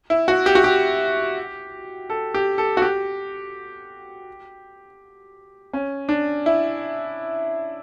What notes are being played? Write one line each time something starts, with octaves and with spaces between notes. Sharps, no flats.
E4
F#4
G4
F#4
G4
A4
G4
A4
F#4
G4
C#4
D4
E4